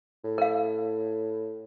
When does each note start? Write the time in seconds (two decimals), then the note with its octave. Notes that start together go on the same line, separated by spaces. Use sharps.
0.24 A2
0.38 A#4 F5